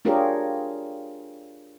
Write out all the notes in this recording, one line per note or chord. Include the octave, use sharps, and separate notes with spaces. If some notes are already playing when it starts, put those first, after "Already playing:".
D4 F4 G4 G#4 A#4 C#5